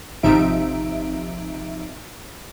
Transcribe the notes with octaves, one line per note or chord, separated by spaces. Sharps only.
G#1 C3 F3 D#4 E5 D7